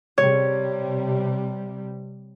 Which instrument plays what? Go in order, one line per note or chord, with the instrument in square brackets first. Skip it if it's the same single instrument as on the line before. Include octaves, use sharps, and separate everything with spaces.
[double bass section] C3 G3 [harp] C#5